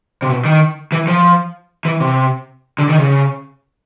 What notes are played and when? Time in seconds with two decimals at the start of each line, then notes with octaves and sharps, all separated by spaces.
0.22 C3
0.30 B2
0.45 D#3
0.92 E3
1.07 F3
1.85 E3
2.01 C3
2.79 D3
2.89 D#3
2.99 C#3